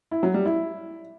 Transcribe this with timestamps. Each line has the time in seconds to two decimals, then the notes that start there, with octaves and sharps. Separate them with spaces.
0.11 E4
0.23 F#3
0.34 G3
0.45 E4